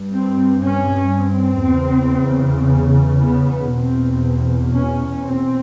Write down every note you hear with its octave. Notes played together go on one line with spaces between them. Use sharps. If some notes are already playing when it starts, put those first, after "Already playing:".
Already playing: G2
C4
C#4
C4
E2 C#3
B3
E2 B2 C4
C#4
C4